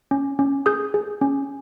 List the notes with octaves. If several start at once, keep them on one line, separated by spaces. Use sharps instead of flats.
C#4
C#4
G#4 D#6 G6
G#4
C#4